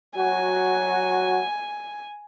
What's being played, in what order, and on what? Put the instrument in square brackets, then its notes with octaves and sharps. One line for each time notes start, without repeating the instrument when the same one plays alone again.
[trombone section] F#3 F#4 [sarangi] G#5